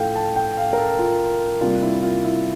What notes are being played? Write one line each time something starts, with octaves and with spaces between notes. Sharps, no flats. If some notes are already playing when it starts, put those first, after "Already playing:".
Already playing: A2 F3 A3 F5 G5
A5
G5
F5
A#4
A4
F4
C3 G3 A#3 D4 F4
E4
F4
E4